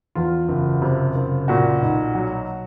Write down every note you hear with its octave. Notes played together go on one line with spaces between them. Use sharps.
E2 F4
F#1
C3
F#1
A#2 F#4
B1
F#3